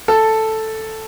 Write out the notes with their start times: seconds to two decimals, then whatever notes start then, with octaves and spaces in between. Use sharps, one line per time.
0.08 A4